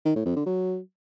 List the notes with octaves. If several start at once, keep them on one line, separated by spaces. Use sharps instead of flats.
D#3
A2
F2
D3
F#3